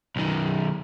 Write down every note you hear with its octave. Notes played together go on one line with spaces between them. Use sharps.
B1 D#3